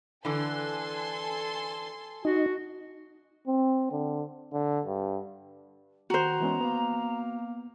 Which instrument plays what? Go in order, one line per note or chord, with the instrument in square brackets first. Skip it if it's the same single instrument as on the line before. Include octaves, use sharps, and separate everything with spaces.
[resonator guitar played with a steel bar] D3 E3 [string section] A4 G#5 C6
[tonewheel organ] D#4 [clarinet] F#4
[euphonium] C4
D3
D3
G2
[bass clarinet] D#3 [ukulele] F#4 C5 [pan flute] A#5
[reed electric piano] E3 B3 C#4 [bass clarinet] G#3
[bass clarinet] A#3 [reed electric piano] B3